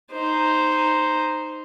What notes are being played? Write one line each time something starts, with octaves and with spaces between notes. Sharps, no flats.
D#4 C5